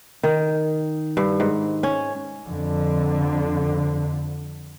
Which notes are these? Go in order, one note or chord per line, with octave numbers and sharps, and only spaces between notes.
D#3
G2
G#2
C#4
F2 D3